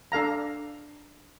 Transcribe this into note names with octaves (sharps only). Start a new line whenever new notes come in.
D4 A4 F5 A#5